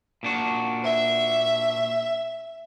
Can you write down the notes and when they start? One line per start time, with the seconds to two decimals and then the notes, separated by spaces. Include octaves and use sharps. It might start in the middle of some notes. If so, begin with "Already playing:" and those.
0.23 A#2 D4 F#4
0.84 E5